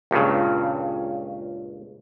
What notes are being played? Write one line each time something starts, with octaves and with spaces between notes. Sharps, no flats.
C#2 G2 A#2 C#3